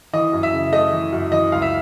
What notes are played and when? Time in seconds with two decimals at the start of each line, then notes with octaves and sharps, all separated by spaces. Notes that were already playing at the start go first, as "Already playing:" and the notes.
0.13 E3 D#5
0.33 F#2
0.43 E5
0.53 C#3
0.72 A3 D#5
0.93 E3
1.12 F#2
1.32 E3 D#5
1.52 C#2 F5
1.62 E5